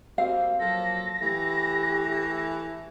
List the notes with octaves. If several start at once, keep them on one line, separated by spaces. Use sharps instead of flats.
G3 A#3 C4 F#4 F5
F3 F#3 A#3 A4 A#6
E3 A3 G4